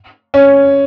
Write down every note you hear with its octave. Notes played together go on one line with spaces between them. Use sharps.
C#4